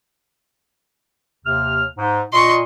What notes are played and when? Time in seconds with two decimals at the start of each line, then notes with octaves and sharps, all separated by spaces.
1.45 D#2 C3 F6
1.98 G#2 D#4
2.33 A#2 D#5 C6 C#6